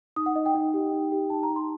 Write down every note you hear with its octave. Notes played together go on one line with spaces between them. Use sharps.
D#4 D#6
F#5
D#4 D#5
G5
D#4
G4
D#4
G4
D#4 A5
A#5
D#4
C6